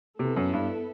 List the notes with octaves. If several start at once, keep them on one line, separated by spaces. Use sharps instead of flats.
C3 B3 E4 A4
F#2
G2